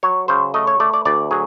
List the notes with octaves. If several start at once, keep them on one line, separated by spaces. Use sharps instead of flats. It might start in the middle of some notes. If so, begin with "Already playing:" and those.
F#3 C#5
C#3 C5
A3 D#5
C#5
A3 D5
D5
D2 D5
F#3 G#4